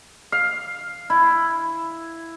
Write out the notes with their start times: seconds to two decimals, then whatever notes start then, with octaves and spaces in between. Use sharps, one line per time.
0.32 F5
1.10 E4